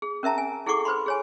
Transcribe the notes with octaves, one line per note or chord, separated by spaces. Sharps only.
G#4
C#4 A#4 E5 A5 A#5
G#5
E4 G#4 A4 F#5 C#6 D6
B4 C5 B5 C6
G#4 C#5 G#5